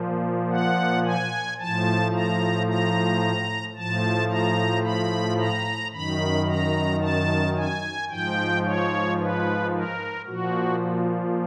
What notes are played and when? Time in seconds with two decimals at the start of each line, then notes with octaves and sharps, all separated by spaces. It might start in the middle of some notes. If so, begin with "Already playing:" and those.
Already playing: A#2 F3
0.50 F#5
1.05 G#5
1.59 A2 F3 A5
2.14 A#5
2.68 A#5
3.76 A2 F3 A5
4.30 A#5
4.84 B5
5.39 A#5
5.93 F#2 D#3 B5
6.47 A#5
7.01 A5
7.56 G#5
8.10 G#2 F3 G5
8.64 C#5
9.18 B4
9.73 A#4
10.27 A#2 F3 F#4